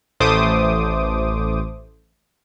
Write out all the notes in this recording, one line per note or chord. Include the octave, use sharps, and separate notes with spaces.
A1 A3 C5 D6 D#6